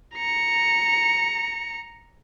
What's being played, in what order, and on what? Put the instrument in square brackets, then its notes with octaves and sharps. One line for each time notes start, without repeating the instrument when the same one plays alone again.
[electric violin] A#5 C#7